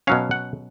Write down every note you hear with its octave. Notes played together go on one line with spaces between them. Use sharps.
B2 F#3 C#4 F5
F#5